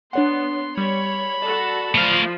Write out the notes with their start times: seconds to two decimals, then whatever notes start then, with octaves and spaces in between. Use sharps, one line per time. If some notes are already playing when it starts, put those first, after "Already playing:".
0.13 B3 D4 C#5 F#5 C6
0.77 G3 C#5 B5
1.42 F#4 A4 D5 A5
1.95 F3 A3 F5